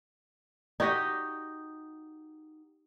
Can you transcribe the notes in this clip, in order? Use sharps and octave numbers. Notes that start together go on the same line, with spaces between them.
D#4 F#4 G4 D#5